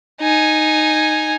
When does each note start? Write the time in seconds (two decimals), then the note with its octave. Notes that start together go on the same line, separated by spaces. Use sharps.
0.21 D#4 G#5